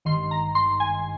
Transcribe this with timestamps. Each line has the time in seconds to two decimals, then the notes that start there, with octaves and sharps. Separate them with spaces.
0.05 G#1 G2 D#3 C6
0.31 A#5
0.55 C6
0.80 G#5